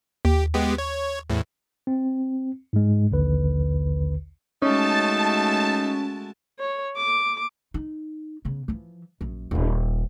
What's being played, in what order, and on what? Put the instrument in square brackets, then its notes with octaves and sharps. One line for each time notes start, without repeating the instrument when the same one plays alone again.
[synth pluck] D#2 [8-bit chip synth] G4
[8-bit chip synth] G#3 B3 G4
C#5
E2 A2
[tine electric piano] C4
G#2 G#3
A#1 D#2 D3 B4
[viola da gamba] G#3 A3 F#4 [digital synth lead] C#4 [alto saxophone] D#4 [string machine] A5
[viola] C#5
D6
[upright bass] D#4
C#3 B3
E3 F3
A#1 F#2
D#1 A#2